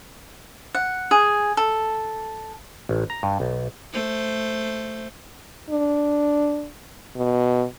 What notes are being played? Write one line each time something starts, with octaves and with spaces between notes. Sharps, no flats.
F#5
G#4
A4
A1
A#5
G2
B1
A3 C5
D4
B2